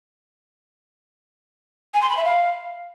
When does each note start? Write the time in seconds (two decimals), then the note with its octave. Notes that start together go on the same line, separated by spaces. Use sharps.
1.94 G#5
2.02 C6
2.10 B5
2.17 E5
2.25 F5